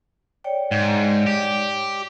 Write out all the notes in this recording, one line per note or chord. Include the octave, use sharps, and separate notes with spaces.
C#5 D5 G5
G#2
G4